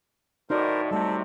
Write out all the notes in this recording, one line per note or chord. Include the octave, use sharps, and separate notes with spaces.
A2 D#4 F#4 A#4 C5 D5
A2 C3 G3 A3 A4